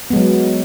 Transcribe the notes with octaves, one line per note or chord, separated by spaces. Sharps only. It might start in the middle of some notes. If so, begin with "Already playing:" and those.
F#3 G#3 B3